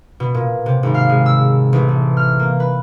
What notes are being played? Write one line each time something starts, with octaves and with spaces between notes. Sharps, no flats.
B2
A#2
C3
G#1
F5
G#3
E6
A1
A3
F6
A#3
B4